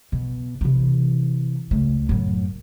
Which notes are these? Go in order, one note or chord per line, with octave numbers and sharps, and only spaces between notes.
B2
C3 E3
C#2 A3
F#2 A2